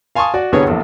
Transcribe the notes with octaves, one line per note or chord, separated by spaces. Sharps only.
F5 G#5 A5 C6 C#6 D#6
F#4 D5
C2 G2 D3 B3 G#4 C#5
A#1 E2 A4